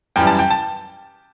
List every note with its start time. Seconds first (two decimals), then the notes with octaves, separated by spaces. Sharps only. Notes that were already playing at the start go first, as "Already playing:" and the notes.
0.16 F#2 E3 G3 G5
0.27 A5
0.39 G5
0.50 A5